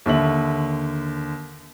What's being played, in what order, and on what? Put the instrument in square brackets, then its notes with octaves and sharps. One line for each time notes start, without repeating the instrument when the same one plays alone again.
[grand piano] D#2 D3 E5 F#7